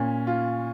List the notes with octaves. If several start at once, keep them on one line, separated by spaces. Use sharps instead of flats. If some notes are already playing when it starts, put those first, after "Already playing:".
Already playing: A#2 C#4
F4